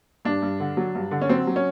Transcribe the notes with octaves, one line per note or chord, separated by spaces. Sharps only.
G2 D4
G2
D3
F#3
G2
D3
C#4
F#3 C4
F#3
C#4